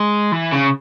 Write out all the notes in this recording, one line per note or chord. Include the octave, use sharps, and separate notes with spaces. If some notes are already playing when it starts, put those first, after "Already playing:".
Already playing: G#3
E3
C#3